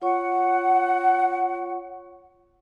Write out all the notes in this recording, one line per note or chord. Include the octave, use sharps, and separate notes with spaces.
F4 C#5 F#5 C#6